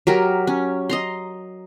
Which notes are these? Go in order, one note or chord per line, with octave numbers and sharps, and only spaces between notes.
F#3 G4 A#4
C#4
D#5 A#5 C6